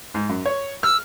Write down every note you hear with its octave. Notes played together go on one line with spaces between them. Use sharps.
G#2
F#2
C#5
E6 F6